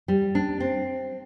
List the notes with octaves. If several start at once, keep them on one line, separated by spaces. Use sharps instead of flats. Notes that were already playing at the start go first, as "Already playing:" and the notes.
G3
D4
C4